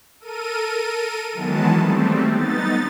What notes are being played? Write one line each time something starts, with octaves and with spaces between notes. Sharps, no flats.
A4 A#4 D#7
D#3 E3 F#3 G#3 B3 A5
G3 A3 C4
B3 D#4 A6